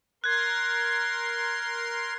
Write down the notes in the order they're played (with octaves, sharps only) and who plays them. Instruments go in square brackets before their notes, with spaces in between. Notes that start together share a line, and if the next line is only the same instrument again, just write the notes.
[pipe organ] A#4 C6 [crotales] F#6 G#6